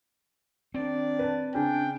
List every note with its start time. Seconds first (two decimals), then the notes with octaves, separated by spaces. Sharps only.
0.74 D#3 C4 D4 D5
1.19 B4 A5
1.55 C#3 C#4 D4 G5